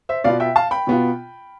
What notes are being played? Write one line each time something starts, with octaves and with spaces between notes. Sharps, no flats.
C5 E5
B2 B3 F4 D5 F5
E5 G5
F5 A5
G5 B5
B2 B3 F4